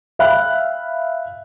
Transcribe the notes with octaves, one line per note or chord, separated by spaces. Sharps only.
E5 F5 G5 B5 F#6